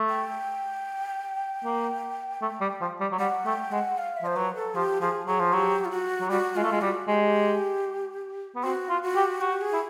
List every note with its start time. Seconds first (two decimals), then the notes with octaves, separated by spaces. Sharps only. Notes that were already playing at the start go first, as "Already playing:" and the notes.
Already playing: A3
0.09 G5
1.64 A#3
2.42 A3
2.61 G3
2.81 F3
3.01 G3
3.12 F#3
3.19 G3 F#5
3.46 A3 G5
3.71 G#3 F#5
3.98 F5
4.17 E5
4.22 F3 C5
4.36 F#3 B4
4.55 A4
4.75 F3 G4
5.01 F3 G#4
5.27 F#3 G#4
5.40 F3
5.53 F#3 G4
5.85 F4
5.91 F#4
6.21 F#3
6.30 G3 F#4
6.56 G#3 F4
6.64 A3
6.72 G#3
6.82 G3 F#4
7.08 G#3 G4
8.56 B3
8.64 C4 F#4
8.89 F4
9.03 F#4
9.16 G4
9.41 F#4 G4
9.61 G#4
9.73 E4